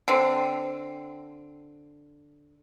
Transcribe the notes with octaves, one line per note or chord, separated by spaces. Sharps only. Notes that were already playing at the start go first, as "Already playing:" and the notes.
D3 C4